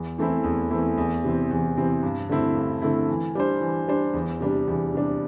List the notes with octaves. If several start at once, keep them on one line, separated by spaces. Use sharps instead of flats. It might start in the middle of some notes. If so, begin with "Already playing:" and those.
Already playing: E2
E3 A3 C4 E4
E2
E3 A3 C4 E4
E2
C3 E3 C4
E2
C3 E3 C4
G2
D3 A3 C4 E4
G2
D3 A3 C4 E4
E3
G3 D4 C5
E3
G3 D4 C5
E2
C3 G3 D4
E2
C3 G3 D4